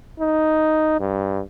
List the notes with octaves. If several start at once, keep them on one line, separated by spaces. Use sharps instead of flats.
D#4
G2